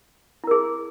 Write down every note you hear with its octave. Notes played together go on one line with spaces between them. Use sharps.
E4 G#4 A#4